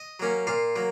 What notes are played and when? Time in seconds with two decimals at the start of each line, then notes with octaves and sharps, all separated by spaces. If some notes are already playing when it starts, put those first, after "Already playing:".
Already playing: D#5
0.20 F#3 A#3 C#4
0.47 A#2 F5
0.76 F#3 A#3